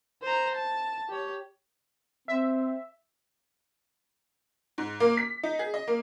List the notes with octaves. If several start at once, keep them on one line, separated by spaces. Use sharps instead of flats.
C5 A#5
A5
G4 C#5
C4 E5
G#2
A#3
B6
D#4
G#4
D#5
A#3